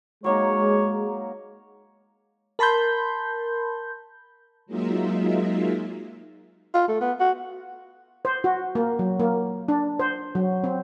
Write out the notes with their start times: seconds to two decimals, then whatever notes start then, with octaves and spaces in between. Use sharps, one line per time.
0.24 F#3 G#3 A#3 D#4 C#5
2.59 A#4 A5 B5 C6 G6
4.66 F#3 G#3 A#3 D#4 F4 E5
6.74 F4
6.88 A3
7.01 B3
7.20 F#4
8.25 C5
8.44 F#4
8.75 A#3
8.99 F#3
9.20 A#3
9.68 D4
9.99 C5
10.35 F#3
10.64 C4